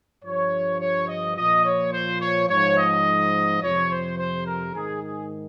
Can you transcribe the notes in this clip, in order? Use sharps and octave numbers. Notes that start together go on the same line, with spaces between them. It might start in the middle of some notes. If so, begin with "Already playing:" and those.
G2 F3 C#5
C#5
D#5
A#2 F3 D#5
C#5
C5
C#5
G#2 F3 C#5
D#5
F2 C3 F3 C#5
C5
C5
A#4
G#2 D#3 G#4
G#4